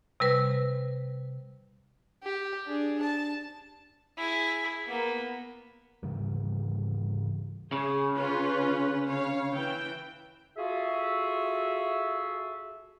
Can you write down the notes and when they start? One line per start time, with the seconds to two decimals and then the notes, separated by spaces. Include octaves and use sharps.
0.20 C3 G3 B4
2.23 G4
2.66 D4 G#4
3.02 A5
4.18 E4 G#4
4.86 A#3 B3
6.03 G#2 C#3 E3 G3
7.72 C#3 G#4
8.14 C#4 F4 B4
9.05 C#5 F5
9.53 E3 G5
10.57 F4 F#4 G#4 A4 E5